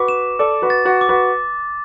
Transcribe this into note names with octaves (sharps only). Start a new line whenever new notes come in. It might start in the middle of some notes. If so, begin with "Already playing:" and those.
Already playing: F#4 B4 D6
E7
A4 D5 D6
F#4 B4
A6
F#4 B4
D6
F#4 B4